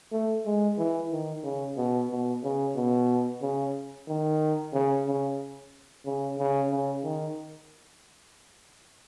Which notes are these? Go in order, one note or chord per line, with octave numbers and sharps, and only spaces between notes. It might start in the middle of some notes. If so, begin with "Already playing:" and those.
A3
G#3
E3
D#3
C#3
B2
B2
C#3
B2
C#3
D#3
C#3
C#3
C#3
C#3
C#3
D#3